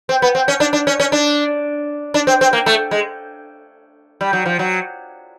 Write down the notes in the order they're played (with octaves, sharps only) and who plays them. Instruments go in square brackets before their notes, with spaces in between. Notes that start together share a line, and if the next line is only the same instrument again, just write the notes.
[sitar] C4
B3
C4
C#4
D4
D4
C#4
C#4
D4
D4
C4
C4
A#3
A3
G#3
G3
F#3
F3
F#3